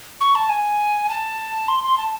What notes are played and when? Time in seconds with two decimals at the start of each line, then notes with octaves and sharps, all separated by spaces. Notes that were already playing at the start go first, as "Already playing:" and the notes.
0.21 C#6
0.35 A5
0.49 G#5
1.09 A5
1.68 C6
1.84 C6
1.98 A5